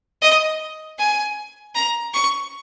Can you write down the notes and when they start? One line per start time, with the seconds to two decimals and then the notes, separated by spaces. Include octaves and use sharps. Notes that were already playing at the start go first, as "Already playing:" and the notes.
0.21 D#5
0.98 G#5
1.75 A#5
2.14 C#6